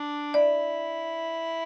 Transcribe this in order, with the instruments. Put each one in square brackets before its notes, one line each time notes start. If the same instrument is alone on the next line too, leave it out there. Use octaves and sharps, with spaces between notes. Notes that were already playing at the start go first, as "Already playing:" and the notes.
Already playing: [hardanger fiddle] D4
[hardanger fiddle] E4 [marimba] D5